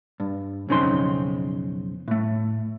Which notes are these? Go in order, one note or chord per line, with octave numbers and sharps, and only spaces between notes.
G2
B1 F2 C#3 C4 D#4 C6
A2 A3